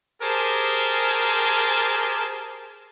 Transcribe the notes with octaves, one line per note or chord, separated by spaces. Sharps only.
G4 G#4 A#4 C5 G#5 A5